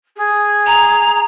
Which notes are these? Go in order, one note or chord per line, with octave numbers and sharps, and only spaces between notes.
G#4
A#5